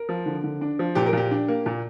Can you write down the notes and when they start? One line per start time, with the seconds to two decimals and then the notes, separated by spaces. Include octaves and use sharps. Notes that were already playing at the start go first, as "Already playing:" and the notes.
Already playing: A#4
0.09 F3
0.26 D3
0.44 D3
0.61 D4
0.79 F3
0.95 A#2 G4
1.06 A#4
1.13 A#2 G4
1.31 D4
1.48 A#3
1.66 A#2